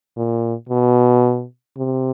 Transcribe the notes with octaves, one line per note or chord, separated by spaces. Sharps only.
A#2
B2
C3